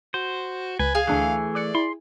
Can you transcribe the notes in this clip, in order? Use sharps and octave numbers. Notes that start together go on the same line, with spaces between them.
F#4 C5
C#2 B4 G#5
G#4 F5
D2 E3 A3 D4 F#6
D5 D6 F#6 C#7
E4 C6